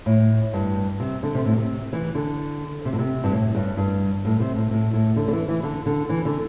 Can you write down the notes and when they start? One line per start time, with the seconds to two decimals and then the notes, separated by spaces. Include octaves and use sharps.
0.06 A2
0.54 G2
1.00 C3
1.23 D3
1.34 C3
1.45 A2
1.57 C3
1.93 E3
2.15 D3
2.85 C3
2.93 A2
2.99 C3
3.24 G2
3.31 A2
3.55 G2
3.77 G2
4.25 A2
4.40 C3
4.56 A2
4.71 A2
4.94 A2
5.16 D3
5.28 D3
5.33 E3
5.48 E3
5.63 D3
5.86 D3
6.09 E3
6.25 D3